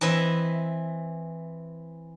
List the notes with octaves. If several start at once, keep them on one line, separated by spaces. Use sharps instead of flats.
E3 C4 E4 B4 D#5 E5